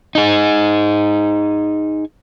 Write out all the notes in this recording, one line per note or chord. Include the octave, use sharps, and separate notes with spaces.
D#4 G#4